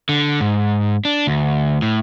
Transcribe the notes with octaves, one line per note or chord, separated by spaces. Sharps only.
D3
G#2
D4
D2
A2